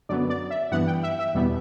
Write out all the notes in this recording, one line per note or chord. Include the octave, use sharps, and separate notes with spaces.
F#2 D3 F#3 B3 D5
D5
E5
G2 E3 B3 F#5
G5
E5
E5
E2 B2 G3 B3